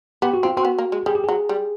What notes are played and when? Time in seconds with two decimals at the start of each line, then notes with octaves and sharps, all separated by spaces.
0.22 B3 G4
0.34 F#4
0.43 C4 F4
0.57 C4 F#4
0.65 B3
0.78 A#3
0.92 G#3
1.06 G3 G#4
1.15 G4
1.24 F#3 G#4
1.49 G3